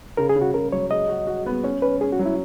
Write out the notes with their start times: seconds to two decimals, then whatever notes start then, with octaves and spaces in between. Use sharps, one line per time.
0.17 C#3 A#4
0.29 G#4
0.36 C#3
0.41 F#4
0.54 C#3 A#4
0.72 F#3 C#5
0.91 G#3 D#5
1.09 F#4
1.27 F#4
1.46 B3
1.63 C#4 C#5
1.82 C#4 B4
2.01 C#4 G#4
2.13 F#4
2.19 F#3
2.26 E4